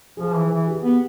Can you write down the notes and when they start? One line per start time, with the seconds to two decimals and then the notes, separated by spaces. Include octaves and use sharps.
0.17 F3 G#4
0.34 E3
0.50 E3
0.67 G4
0.84 B3